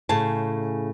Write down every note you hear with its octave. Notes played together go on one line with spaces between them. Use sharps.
A2 C#3 G#4 A5